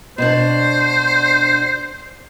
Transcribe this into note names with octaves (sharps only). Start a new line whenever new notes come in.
B2 D4 C5